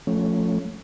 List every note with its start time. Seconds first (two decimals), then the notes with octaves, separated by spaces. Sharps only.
0.07 F3 A3 C#4